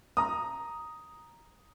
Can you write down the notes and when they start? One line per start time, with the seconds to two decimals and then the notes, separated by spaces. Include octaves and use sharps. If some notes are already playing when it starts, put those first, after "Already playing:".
0.17 A#5 D#6